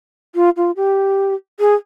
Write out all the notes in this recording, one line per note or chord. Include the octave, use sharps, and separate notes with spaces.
F4
F4
G4
G#4